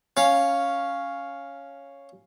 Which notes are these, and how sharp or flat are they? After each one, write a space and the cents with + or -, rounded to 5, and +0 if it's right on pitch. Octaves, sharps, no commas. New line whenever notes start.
C#4 +0 F5 +0